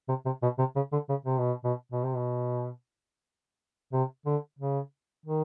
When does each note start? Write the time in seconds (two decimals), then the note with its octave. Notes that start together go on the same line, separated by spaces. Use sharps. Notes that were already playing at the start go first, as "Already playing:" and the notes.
0.09 C3
0.26 C3
0.43 B2
0.59 C3
0.76 C#3
0.92 D3
1.09 C#3
1.26 C3
1.39 B2
1.64 B2
1.92 B2
2.04 C3
2.16 B2
3.93 C3
4.26 D3
4.59 C#3
5.26 D#3